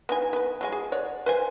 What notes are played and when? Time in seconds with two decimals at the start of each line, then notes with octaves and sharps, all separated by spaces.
0.09 B3 D#4 G#5
0.33 B3 B4
0.61 F#3 G#3 G#5
0.72 G#4
0.92 C#5 D5 F#5
1.26 B4 C5 G#5